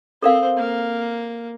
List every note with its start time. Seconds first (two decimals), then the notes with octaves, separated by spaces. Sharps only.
0.23 C4 A4 A#4 C5 F5
0.57 A#3